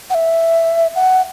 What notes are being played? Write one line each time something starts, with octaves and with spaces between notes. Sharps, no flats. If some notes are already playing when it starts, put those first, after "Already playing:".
F#5
E5
F#5